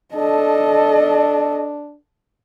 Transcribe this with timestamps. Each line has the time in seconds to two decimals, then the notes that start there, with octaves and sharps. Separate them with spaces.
0.15 D4 A4 D#5